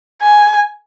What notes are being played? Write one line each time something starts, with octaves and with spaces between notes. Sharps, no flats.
G#5